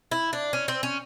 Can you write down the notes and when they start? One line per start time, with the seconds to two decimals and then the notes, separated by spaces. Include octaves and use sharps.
0.11 E4
0.33 D4
0.53 C#4
0.68 C4
0.83 C#4